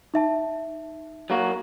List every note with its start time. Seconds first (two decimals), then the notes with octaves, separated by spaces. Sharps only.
0.14 D#4 E5 A5
1.30 F#3 A#3 F#4